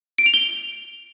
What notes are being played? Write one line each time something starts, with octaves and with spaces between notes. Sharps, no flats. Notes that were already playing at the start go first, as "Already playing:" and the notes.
D7
F7
G7